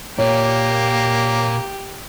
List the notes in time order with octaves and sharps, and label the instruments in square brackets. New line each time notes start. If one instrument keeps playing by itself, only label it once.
[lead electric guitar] A#2 [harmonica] A#3 [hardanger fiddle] G4 [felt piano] C#5